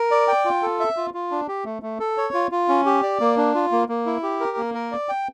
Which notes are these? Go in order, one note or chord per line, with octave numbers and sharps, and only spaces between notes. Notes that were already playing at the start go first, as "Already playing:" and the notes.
Already playing: A#4
D5
G5
F4
A4
E5
F4
F4
D4
G4
A3
A3
A4
C#5
F4
F4
C#4
G4
D5
A#3
D4
F4
A#3
A#3
E4
G4
A#4
A#3
A#4
D5
G5